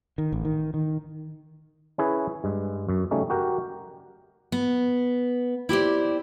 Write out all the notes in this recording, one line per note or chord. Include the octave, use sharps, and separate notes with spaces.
D#3
A1
D#3
D#3
C#4 E4 G#4 B4
G2 G#3
F#2
C#3 G3 A3 C#4 D#4
F#4 G4 A#4
B3
E4 G4 C5 D5